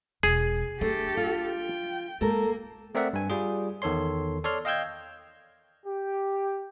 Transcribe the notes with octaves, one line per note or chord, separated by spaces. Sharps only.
E1 G#4
A3 D4 G4 A4
F4
G5
G#3 A#3 A4 A#4
A3 C4 A#4 D5 E5 F#5
G2 G#5
G3 F4 G#4
E2 D#3 A4 C#5 C6
A4 C#5 D5 C6 F6
D#5 F5 G5 E6 G6 G#6
G4